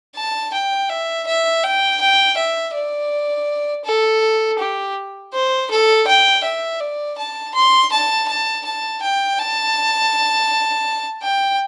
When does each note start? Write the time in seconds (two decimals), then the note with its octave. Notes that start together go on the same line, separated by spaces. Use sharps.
0.16 A5
0.53 G5
0.90 E5
1.27 E5
1.64 G5
2.01 G5
2.38 E5
2.75 D5
3.85 A4
4.59 G4
5.34 C5
5.70 A4
6.07 G5
6.44 E5
6.80 D5
7.18 A5
7.54 C6
7.92 A5
8.28 A5
8.65 A5
9.03 G5
9.39 A5
11.23 G5